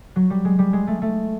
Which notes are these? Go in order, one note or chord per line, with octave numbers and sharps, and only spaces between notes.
F#3
G3
G#3
G3
G#3
A3
A3